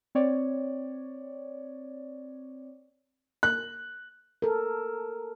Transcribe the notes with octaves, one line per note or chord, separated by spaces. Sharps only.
C4 C#5 D5
F#6
A4 A#4